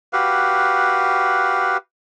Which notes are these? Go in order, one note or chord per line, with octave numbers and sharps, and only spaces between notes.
F#4 G4 B4 F5